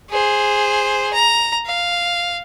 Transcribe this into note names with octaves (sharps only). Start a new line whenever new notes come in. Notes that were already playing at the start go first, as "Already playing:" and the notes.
G#4 C5
A#5
F5